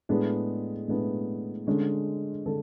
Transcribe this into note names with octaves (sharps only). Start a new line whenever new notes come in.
A2 G#3 B3 D4 G#4
A2 G#3 B3 D4
D3 G#3 C#4
D3 G#3 A4